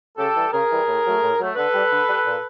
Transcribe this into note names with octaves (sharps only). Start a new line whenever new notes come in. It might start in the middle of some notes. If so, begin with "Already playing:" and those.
C#3 G4 A4
E3 G3
C#3 G#4 A#4
E3 G3
A2
F#3 A3
A2
F#3 A3
D3 A4 B4
G3
D3
G3
A#2